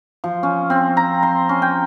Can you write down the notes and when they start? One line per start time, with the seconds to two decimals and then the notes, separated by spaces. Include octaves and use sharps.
0.24 F3
0.43 C#4
0.70 C4
0.97 A#5
1.23 C6
1.49 C#4
1.62 G5